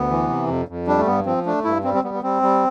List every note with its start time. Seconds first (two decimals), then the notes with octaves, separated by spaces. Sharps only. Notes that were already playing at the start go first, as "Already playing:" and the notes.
Already playing: D2 B3
0.10 E3
0.29 C3
0.48 F2
0.68 F2
0.87 G3 D4
0.98 A3
1.06 G2 B3
1.26 F3 C4
1.46 A3 D4
1.64 G2 E4
1.84 G3 C4
1.94 C4
2.04 G3 B3
2.14 B3
2.23 G3 C4
2.42 G3